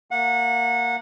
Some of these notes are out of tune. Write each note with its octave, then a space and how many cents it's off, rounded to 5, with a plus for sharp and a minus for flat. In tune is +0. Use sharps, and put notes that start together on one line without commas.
A#3 -15 F#5 -25